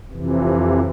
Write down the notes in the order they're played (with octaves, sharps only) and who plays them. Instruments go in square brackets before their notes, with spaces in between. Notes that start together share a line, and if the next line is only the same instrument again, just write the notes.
[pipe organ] F2 C3 E3